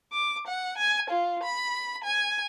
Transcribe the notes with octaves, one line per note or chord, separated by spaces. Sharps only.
D6
F#5
G#5
F4
B5
G#5